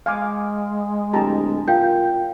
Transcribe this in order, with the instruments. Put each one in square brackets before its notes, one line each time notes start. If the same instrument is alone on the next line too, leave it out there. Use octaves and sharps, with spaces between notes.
[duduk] G#3 [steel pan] F5 G#5 D6
[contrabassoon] D1 [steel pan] G4 A5 A#5
[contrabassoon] A#2 [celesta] F5 G5 G6